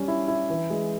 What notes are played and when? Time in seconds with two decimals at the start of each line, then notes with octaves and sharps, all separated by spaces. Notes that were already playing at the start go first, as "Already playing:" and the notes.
Already playing: G3 C#4
0.08 E4
0.28 E4
0.50 E3
0.70 G#3